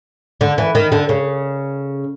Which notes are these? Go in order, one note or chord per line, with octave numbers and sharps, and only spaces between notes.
D3
E3
D#3
D3
C#3